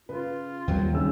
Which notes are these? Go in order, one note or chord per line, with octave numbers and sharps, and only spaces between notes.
C#3 F4 B4
D#2 F#3 G3 C4 A#4
C#3 G3 C4 D#4 E6